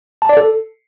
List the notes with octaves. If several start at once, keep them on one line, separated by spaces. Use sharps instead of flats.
A5
D5
A4